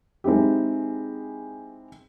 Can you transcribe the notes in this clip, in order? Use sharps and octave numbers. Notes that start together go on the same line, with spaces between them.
G#3 C4 D#4 E4 G4